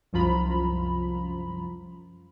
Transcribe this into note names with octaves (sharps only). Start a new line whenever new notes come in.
C2 F#2 F3 F4 A#5 B5